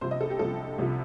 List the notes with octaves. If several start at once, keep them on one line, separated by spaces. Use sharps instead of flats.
C2 C3 F3 C5
D#5
A4
G4
C2 C3 F3 A4
C2 C3 F3